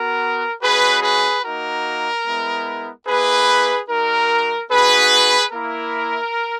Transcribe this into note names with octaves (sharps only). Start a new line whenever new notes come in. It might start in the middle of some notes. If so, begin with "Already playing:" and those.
Already playing: B3 F#4 A#4
G#3 C#4 F#4 G#4 B4
G#4 B4
A#3 D#4 F#4 A#4
G#3 B3 E4
A#3 E4 G#4 B4
G#3 D#4 F#4 A#4
B3 D#4 F#4 G#4 B4
A#3 E4 A#4